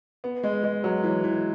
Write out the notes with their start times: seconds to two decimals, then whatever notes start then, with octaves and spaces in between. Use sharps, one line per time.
0.24 B3
0.43 G#3
0.64 G#3
0.84 F#3
1.04 E3
1.24 E3